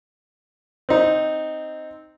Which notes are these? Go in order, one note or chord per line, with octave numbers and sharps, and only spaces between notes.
C4 D#4